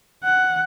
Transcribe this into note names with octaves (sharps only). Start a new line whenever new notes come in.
F#5